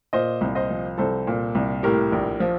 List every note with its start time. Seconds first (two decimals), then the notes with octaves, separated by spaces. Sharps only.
0.13 A#2 C5 D#5
0.41 C2
0.55 C5 D#5
0.70 F3
0.98 C2 A4 C5
1.27 A#2
1.55 C2
1.83 A2 G4 A#4
2.12 A#1
2.40 F3